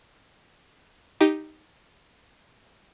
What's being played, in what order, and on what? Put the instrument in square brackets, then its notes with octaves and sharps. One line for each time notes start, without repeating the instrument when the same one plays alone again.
[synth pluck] D#4 G4